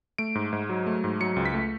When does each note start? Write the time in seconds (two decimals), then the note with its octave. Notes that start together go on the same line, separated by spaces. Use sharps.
0.18 A3 D7
0.35 G#2
0.53 G#2
0.69 F#3
0.87 A3
1.04 G#2
1.20 F#3 C#7
1.36 C#2
1.45 B6
1.54 A3